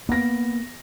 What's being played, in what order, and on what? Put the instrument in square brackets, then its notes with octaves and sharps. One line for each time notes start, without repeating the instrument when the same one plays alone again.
[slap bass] A#3 [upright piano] B3 A#6